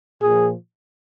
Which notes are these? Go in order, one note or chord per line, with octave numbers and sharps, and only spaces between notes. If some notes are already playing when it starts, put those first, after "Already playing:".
A#2 F3 G#4